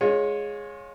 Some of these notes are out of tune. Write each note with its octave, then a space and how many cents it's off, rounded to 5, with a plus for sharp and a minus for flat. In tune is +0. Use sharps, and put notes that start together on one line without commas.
G#3 +0 F4 +30 C#5 -5